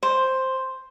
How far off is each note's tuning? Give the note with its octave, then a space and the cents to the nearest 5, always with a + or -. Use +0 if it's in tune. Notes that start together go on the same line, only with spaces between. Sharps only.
C5 +5